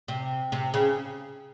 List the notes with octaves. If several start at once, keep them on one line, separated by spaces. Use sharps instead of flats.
C3
C3
C#3